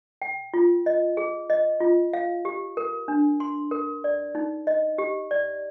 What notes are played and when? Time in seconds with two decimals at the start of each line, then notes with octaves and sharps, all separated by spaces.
0.22 G5
0.54 F4
0.86 D#5
1.17 G#4
1.50 D#5
1.80 F4
2.13 F5
2.45 G4
2.77 A#4
3.08 D4
3.40 C6
3.71 A#4
4.04 D5
4.35 D#4
4.67 D#5
4.98 G4
5.31 D5